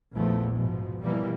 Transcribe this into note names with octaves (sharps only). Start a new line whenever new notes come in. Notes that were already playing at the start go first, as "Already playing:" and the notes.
A#1 E2 F3 A3
G#2 B2 F3
B2 E3 F3 G3 A#3